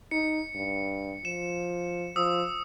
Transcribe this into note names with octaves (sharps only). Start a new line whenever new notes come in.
D#4 C#7
G2
F3 E7
F3 D#6 E6